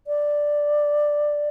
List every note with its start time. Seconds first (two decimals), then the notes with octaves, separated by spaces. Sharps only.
0.07 D5